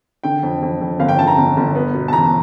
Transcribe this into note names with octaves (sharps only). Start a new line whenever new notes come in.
D3 G5
F2
F2
F2
G1 F5
G5
G1 A5
A#5
G1
G1
B3
B2
A5
E2 A#5